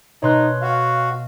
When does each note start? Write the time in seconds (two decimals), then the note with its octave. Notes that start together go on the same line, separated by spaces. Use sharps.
0.23 B2 D#4 C#5 F#5 C6 F#6
0.62 F#4 F5